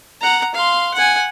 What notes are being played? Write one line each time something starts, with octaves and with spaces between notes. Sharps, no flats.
F#5 A#5
F5 C6
F#5 G#5